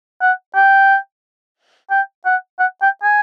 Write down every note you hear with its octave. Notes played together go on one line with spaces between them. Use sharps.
F#5
G5
G5
F#5
F#5
G5
G#5